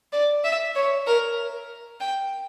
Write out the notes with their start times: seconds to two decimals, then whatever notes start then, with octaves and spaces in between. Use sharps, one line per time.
0.13 D5
0.44 E5
0.75 C#5
1.07 A#4
2.00 G5